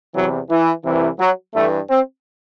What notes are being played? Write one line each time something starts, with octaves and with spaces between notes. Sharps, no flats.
E2 C3 E3 F#3
E3
C2 C3 E3
F#3
G2 E3 A3
C4